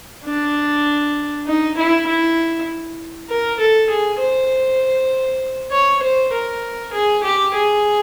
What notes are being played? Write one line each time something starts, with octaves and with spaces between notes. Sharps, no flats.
D4
D#4
E4
E4
A#4
A4
G#4
C5
C#5
C5
A#4
G#4
G4
G#4